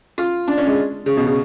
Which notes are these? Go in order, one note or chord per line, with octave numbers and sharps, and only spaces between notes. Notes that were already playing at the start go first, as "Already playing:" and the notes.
F4
D4
C#4
G#3
C#3
B2
C#3